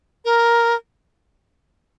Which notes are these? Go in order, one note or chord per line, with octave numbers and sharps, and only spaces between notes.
A#4